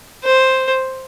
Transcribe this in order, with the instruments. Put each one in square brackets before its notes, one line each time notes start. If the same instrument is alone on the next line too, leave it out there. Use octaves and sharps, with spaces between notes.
[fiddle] C5